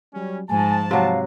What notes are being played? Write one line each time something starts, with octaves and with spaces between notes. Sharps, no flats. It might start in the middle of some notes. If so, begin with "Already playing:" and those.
F#3 G3 C#4
G#2 F3 G#5 A5
C3 F#3 F5